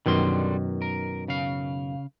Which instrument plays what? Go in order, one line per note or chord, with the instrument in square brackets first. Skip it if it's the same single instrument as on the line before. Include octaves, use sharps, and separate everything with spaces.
[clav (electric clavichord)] F#2 B2 D#3 [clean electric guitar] D3 G3 C6
[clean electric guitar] A#4
C#3 F5